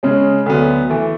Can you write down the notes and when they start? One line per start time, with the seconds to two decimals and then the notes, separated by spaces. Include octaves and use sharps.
0.03 C#3 G#3 C#4
0.46 D2 D3 F#3 B3
0.89 E3 A3